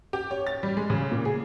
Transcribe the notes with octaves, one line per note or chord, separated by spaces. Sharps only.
G4
C#5
A6
G3
G#3
C#3
A#2
G#4